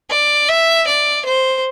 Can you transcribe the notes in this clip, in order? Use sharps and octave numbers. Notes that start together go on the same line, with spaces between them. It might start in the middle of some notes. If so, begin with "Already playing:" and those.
D5
E5
D5
C5